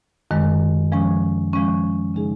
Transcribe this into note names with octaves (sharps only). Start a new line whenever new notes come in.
F#2 D#3 G#3
F3 G#3 C#4
F3 G#3 C#4
C#3 G#3 D#4 G#4